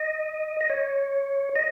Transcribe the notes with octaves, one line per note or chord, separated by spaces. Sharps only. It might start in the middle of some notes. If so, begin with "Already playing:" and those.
Already playing: D#5
D#5
C#5
D#5